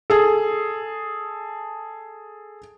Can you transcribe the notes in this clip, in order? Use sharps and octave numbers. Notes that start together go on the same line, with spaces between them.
G#4 A4